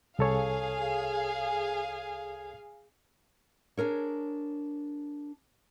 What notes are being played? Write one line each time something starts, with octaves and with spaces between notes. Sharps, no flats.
C2 G#4 A4 C#5 F5
D4 G#4 A#4 C#5